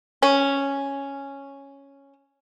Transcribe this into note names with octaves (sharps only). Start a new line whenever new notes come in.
C#4